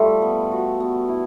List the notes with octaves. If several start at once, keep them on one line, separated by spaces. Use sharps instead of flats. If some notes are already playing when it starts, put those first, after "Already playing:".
Already playing: G3 A3 F4
B3
F#4
B3
E4